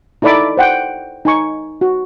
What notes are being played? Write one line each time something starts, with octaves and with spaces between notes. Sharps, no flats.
D#4 E4 A4 D5 B5 D6
C5 F#5 G5
D#4 G#5 C#6
F#4